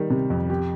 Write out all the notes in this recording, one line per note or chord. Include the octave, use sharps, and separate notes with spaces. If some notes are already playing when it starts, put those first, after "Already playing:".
Already playing: D#3 G3
C3
F2
G4